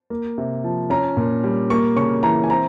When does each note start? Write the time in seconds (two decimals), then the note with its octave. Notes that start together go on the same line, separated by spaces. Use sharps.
0.10 A#3
0.38 C3
0.64 F3
0.90 C#4 A#5
1.17 A#2
1.44 G3
1.70 A#3 C#6
1.96 C#3 C#6
2.23 E3 A#5
2.44 G#5
2.50 C4 A#5